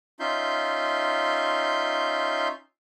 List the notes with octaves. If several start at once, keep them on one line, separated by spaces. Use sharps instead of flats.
C#4 D#4 F4 E5 C6 G6